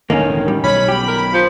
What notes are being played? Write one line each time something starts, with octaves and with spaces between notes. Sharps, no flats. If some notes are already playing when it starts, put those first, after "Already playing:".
E1 A2 D3 D#3 A#3 C#4
G3
B1 B2 D#3 C#4 B5
G4
A#4
F3